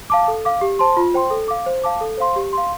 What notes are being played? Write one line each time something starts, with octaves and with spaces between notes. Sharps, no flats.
F5 A5 D6
A4
F5 D6
G4
C5 A5 C6
F4
C5 G5 C6
A4
F5 D6
C5
F5 A5 D6
A4
C5 F5 C6
G4
F5 C6